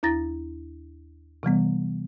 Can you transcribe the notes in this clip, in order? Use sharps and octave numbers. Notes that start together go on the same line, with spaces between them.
D#2 E4 A#5 A6 A#6
C3 E3 G3 B3